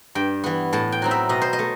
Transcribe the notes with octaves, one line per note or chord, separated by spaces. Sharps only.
G2 G5
E3 B3
A2 A5
G5
F#3 C4 D#4
E5
B2 D#5
C5
D#5
A3